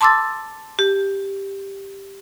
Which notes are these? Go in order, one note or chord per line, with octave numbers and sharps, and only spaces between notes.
A5 C6 D6 E6 A6
G4